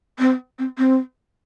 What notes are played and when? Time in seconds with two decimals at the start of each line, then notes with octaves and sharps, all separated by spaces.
0.19 C4
0.59 C4
0.78 C4